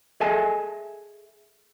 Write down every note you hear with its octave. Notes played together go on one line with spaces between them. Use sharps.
G#4 A4 D#5 E5 G#5 A5